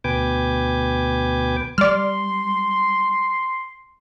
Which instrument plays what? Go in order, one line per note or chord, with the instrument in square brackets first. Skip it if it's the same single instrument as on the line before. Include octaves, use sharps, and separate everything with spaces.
[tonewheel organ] D2 B2 B4 G5 G#5 D6
[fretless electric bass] G3 [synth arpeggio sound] D5 F6 [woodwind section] C6